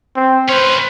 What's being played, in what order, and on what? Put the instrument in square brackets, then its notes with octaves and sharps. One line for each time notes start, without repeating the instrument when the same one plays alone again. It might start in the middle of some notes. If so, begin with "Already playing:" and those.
[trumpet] C4
[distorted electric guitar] C#4 B4 [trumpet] C5